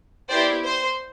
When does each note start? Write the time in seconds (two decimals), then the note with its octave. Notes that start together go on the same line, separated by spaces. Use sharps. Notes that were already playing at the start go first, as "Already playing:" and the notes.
0.29 B3 E4 G4 C5 D5
0.64 C5